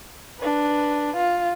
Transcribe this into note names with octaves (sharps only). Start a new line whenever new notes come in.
D4 B4
F4